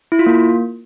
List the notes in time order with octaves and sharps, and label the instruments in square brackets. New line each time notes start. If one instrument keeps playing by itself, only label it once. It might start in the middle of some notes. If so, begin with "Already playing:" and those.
[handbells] E4
F4
A#3